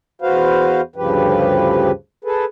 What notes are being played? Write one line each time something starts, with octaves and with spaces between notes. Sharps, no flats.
E2 F#4 B4 C5 F5
D2 G2 C#3 F3 G4 B4
G#4 A4 B4